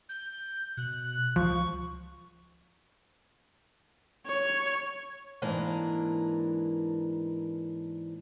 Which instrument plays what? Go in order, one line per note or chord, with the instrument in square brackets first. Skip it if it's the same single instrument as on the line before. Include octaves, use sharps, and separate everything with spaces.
[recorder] G6
[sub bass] B2 [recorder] F#6
[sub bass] C#2 [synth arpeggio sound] F3 [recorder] C#6
[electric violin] C#5
[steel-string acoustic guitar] G#2 E3 A#3 D4